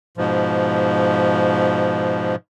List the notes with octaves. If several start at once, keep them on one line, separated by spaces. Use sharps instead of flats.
G#2 B2 F3